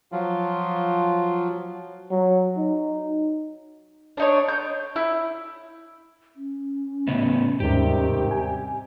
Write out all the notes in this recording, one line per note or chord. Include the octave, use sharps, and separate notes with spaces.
F3 F#3 F4
F#3
D#4
D4 D#4 C#5
G6
E4
C#4
A2 C#3 B3
D#2 G#2 C3 D#3 G3 G4
G#5